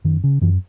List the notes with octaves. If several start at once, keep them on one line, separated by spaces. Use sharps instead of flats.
F#2 D#3
C#3
F#2 E3